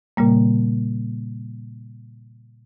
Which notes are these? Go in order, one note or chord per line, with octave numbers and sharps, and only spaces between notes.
A#2 C#3 G3 A#3